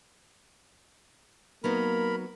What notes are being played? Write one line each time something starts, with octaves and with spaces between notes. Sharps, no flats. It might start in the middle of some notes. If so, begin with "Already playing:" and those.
F#3 A#3 B3 D#4 A#4 B5